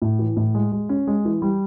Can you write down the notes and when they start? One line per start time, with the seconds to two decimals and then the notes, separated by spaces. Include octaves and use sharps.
0.02 A2
0.19 E3
0.36 A2
0.54 G#3
0.72 G#3
0.89 C#4
1.07 G#3
1.25 E3
1.42 G3